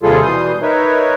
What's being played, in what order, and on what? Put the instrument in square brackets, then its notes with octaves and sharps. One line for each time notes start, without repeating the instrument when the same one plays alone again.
[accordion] D#2 C3 G3 F4 G#4 A4
B2 E3 G3 C6 D#6 G6
D#4 A#4 B4 C#5 E5